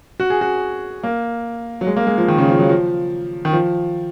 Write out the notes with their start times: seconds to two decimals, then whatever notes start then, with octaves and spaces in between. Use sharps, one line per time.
0.20 F#4
0.30 G#4
0.41 F#4
1.03 A#3
1.81 F#3
1.87 G#3
1.96 A#3
2.07 G#3
2.18 F3
2.28 D#3
2.38 C#3
2.49 F3
2.59 F#3
2.69 F3
3.45 D#3
3.53 F3